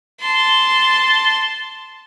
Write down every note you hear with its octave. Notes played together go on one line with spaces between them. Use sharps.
A5 C6